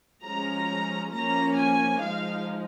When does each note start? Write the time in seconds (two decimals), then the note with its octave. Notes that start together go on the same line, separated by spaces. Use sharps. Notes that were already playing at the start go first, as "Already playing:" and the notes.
0.23 F3 G#3 C#4 A#5
1.12 F3 A#3 C#4 A#5
1.56 G#5
2.00 F3 G#3 D#4 F5